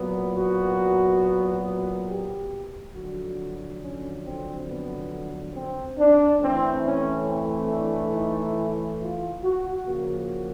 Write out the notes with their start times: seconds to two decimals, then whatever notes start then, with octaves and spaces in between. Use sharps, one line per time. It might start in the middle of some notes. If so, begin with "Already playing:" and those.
Already playing: A#2 F#3 B3
0.34 F#4
2.07 G4
2.94 F2 D3 F#3 F#4
3.80 C#4
4.23 C4
4.67 B3
5.53 C4
5.97 D4
6.39 A2 E3 A3 C4
6.84 C#4
7.26 C4
7.70 D4
8.14 D#4
8.56 E4
9.00 F4
9.43 F#4
9.86 C#3 F3 A#3 F#4